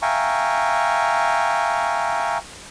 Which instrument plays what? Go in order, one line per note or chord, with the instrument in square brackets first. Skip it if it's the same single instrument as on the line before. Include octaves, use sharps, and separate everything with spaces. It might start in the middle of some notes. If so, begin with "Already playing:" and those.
[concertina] E5 F5 G5 G#5 A#5 C#6